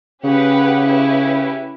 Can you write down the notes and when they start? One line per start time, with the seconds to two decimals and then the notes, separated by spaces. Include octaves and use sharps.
0.24 C#3 C#4 G4 B4 F#5
0.86 C#4 E4 G4 B4